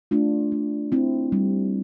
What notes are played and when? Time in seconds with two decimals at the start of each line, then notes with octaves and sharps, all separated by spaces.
0.11 A3 D4 F4
0.52 A3
0.92 C4 E4
1.32 G3